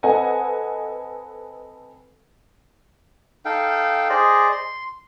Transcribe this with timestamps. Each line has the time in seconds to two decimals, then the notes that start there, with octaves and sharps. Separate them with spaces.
0.03 C4 A4 B4 D#5 F#5 G#5
3.45 D#4 A4 F5 G5
4.10 G#4 C5 D5 D#5
4.52 C6